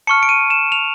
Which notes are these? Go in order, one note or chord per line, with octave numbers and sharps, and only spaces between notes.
A5 C#6 F6 C#7
D7
D#7
E7
F7